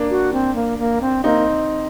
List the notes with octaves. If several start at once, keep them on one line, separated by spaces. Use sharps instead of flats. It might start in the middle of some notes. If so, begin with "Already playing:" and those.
Already playing: A#3 D4
F#4
C4
A#3
A#3
C4
A#3 C4 D#4